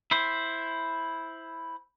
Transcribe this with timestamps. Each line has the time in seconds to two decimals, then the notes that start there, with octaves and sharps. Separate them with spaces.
0.11 E4 C5